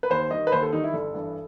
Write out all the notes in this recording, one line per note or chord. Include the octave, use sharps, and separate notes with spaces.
B4
D#2 C5
D#3 G3 D#5
B4
D#2 C5
A4
D#3 G3 D#4
E4
G1 A4
G2 E3